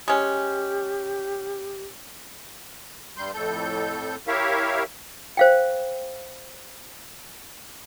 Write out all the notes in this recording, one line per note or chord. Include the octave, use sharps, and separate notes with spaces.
G#3 C#4 G4
G2 G3 C6 G6
F2 A2 A4 G6
E4 G4 A#4 C#5 E5 F5
C5 F5 G5